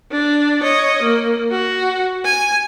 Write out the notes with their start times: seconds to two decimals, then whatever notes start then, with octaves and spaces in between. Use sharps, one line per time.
0.12 D4
0.63 C#5 D#5
1.03 A#3
1.51 F#4
2.25 G#5